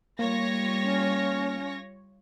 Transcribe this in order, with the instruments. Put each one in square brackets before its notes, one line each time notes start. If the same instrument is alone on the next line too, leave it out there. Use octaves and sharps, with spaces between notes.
[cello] G3 [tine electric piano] A#3 [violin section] F4 C#5 A#6
[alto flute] C#4